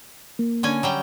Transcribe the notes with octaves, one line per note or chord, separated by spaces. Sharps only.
A#3
D3 C#4 G#5
F#3 G3 G5